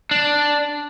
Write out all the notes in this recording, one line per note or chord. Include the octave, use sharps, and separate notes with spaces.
D4